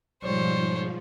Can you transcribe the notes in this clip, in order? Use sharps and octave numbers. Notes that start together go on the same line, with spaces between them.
G#2 B2 F3 G3 C5 C#5